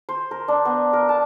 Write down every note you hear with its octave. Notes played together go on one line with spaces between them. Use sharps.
C5
A#4
D4
B3
A#4
A5